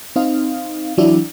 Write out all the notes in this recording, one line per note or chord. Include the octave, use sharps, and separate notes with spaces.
C4 D#4 F5
E3 F#3 D4 E4